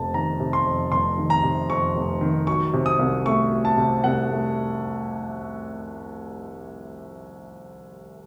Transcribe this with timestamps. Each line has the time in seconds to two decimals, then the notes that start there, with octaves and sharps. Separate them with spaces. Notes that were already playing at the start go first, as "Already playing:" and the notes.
Already playing: F1 F2 C3 A5
0.14 D#3 A#5
0.40 C3
0.53 C6
0.66 F2
0.92 F1 C6
1.18 D#3
1.30 A#5
1.44 C3
1.70 F2 C#6
1.96 F1
2.21 D#3
2.47 F#3 C#6
2.73 C3
2.86 D#6
2.99 C2
3.25 A3 C#6
3.51 F#3
3.65 A5
3.77 C3
4.04 C2 F#5
4.29 A3